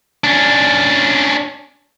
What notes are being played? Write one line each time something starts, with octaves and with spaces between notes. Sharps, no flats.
C#4 D4